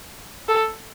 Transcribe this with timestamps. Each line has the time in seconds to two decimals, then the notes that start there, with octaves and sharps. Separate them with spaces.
0.48 A4